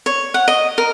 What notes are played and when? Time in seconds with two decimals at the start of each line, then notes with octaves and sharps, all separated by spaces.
0.06 C#5
0.34 F#5
0.48 D#5
0.78 A#4